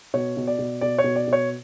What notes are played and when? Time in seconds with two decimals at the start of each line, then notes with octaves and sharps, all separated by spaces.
0.14 B2 C#5
0.37 B2
0.47 D5
0.59 B2
0.81 B2 D5
0.99 C#5
1.04 B2
1.16 D5
1.27 B2
1.33 C#5